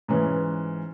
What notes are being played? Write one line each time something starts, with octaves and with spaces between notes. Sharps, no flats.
G#2 E3 C#4